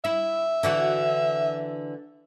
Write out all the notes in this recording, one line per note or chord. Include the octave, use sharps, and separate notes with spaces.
E4 E5
D3 E3 F#4